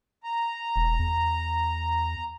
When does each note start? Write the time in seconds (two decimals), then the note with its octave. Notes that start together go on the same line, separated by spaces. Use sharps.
0.24 A#5
0.76 E1
0.99 E2